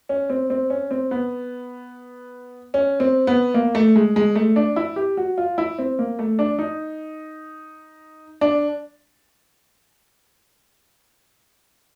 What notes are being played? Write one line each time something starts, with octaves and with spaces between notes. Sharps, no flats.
C#4
C4
C4
C#4
C4
B3
C#4
C4
B3
A#3
A3
G#3
G#3
A3
D4
E4
G4
F#4
F4
E4
C4
A#3
A3
D4
D#4
D4